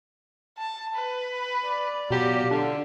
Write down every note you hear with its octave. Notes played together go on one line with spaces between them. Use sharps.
A5
B4
D5
B2 F#3 F4 G4
D3 D4